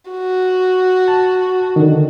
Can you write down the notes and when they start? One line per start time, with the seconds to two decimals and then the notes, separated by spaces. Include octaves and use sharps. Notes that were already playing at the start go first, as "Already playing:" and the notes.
0.11 F#4
1.08 A5
1.76 D3 D#3